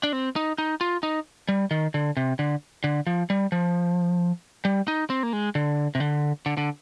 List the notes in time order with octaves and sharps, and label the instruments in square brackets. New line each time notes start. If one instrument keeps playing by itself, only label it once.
[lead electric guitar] D4
C4
D#4
D#4
F4
D#4
G3
D#3
D3
C3
D3
D3
F3
G3
F3
G3
D#4
C4
A#3
G#3
D3
C3
D3
D3
D3